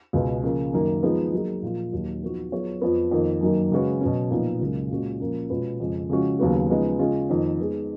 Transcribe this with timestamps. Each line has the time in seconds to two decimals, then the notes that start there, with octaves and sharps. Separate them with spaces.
0.13 C#2 B2 G#3 B3
0.43 C#3 F3 A#3
0.73 F#2 D#3 A#3
1.03 F3 G#3 B3 D#4 G#4
1.33 F#3 A#3 D#4 G#4
1.62 A#2 F3 A#3 F4
1.92 D#2 D#3 F#3
2.22 F3 B3 D#4 F#4
2.52 F#3 B3 F4 G#4 C#5
2.81 F2 F3 B3
3.11 F2 D#3 A#3 F4
3.41 F#2 D#3 F#3 A#3
3.72 C#3 G#3 C#4 F#4 B4
4.01 B2 F#3 C#4
4.31 A#2 F3 B3 D#4
4.61 C#2 C#3 F#3 A#3
4.91 A#2 G#3 C#4 F#4
5.20 A#2 F3 A#3 C#4
5.50 B2 G#3 C#4 F4 B4
5.80 F2 C#3 G#3
6.10 C#3 F3 G#3 C#4 F#4
6.39 D#2 C#3 F#3 B3 F#4
6.69 C#3 F3 G#3 B3 D#4
6.99 C#3 G#3 C#4 F4 G#4
7.29 F2 D#3 A#3
7.59 D#3 G#3 B3 D#4 G#4